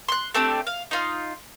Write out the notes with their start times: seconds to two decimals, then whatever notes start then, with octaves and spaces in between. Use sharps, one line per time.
0.09 C6 F#6
0.34 A3 C4 D4 G4
0.67 F5
0.91 D#4 F4 F6